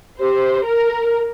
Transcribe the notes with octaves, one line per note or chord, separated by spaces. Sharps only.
G4 C5
A#4